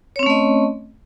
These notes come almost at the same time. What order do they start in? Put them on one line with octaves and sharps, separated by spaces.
C#5 C4 C#4 A3 D#5